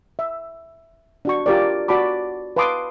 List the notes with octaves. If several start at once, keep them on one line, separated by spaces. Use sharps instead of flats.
E5
D4 F#4 C#6
F4 G4 A#4 D5
F#4 D5 A5 B5 D6
B4 F5 A5 C6 D6 D#6